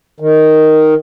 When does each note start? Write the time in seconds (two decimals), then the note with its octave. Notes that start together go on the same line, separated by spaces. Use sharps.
0.20 D#3